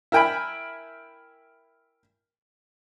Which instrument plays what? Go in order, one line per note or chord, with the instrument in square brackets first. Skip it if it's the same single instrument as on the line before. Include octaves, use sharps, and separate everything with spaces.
[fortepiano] E4 A#4 G5 G#5 B5